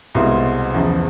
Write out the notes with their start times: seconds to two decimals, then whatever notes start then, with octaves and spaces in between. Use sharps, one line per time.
0.15 C2 B2 G#3 C4 F4
0.74 E2 C#3 F3